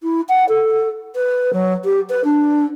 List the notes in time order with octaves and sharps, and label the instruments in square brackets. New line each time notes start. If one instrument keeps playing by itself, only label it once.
[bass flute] E4
F#5
A4
B4
F#3
G4
B4
D4